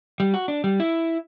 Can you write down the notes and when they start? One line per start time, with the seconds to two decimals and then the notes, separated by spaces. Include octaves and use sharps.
0.20 G3
0.34 F#4
0.48 D4
0.64 G3
0.80 E4